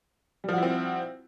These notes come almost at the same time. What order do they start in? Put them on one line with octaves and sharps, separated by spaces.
G3 F3 F#4 E4 C4